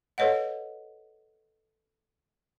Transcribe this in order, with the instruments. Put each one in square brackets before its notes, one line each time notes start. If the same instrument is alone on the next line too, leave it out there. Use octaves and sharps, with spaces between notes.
[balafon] A4 B4 C#5 D#5 F#5